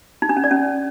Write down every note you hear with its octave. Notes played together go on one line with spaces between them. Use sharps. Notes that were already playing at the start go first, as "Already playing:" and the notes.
D#4
D4
C#4
D5
C#4